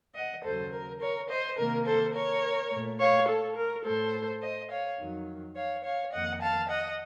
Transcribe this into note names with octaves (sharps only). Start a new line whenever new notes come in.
D#5 F#5
D#2 C#3 F#3 A4 C5
A#4
A#4 C#5
C5 D#5
C3 D#3 A#3 A#4
A4 C5
A#4 C#5
A#2 A3
C#5 F5
A4
A#4
A2 A3 A4 C5
C5 D#5
C#5 F5
F2 D#3 F#3
C#5 F5
C#5 F5
F2 D#3 A#3 D#5 F#5
F5 A5
D#5 F#5